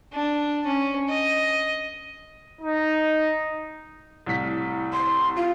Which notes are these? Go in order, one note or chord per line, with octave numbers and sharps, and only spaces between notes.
D4
C#4
D#5
D#4
C2 A2 B6
C6
F4